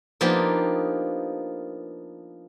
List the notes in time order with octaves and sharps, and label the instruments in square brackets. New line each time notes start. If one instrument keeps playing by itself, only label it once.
[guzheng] F3 A#3 B3 D4 D#4 G4